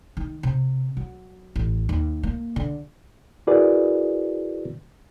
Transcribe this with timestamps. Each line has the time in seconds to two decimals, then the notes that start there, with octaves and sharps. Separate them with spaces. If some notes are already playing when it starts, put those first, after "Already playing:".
0.17 D#3
0.43 C3
0.97 F#3
1.56 A1
1.89 D#2
2.23 A#3
2.56 D3
3.47 E4 F#4 G#4 A#4 B4 D5